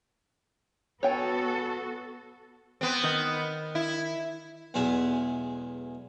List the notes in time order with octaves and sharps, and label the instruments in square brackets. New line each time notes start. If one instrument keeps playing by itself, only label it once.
[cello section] B3 F#4 A4 [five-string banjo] C#5 G5 G#5
[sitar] B3 C4
[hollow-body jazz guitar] D#3 D#4
[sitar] E4
[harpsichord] B1 E2 G#3 E5